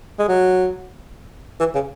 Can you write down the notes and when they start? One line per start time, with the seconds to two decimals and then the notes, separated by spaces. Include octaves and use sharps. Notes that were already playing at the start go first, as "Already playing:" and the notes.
0.19 G#3
0.28 F#3
1.60 E3
1.74 C#3